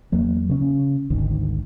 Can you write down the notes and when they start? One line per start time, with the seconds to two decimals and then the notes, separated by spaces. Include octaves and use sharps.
0.12 E2 F#3 A#3
0.49 C#3 C#4
1.10 G#1 D2 D#3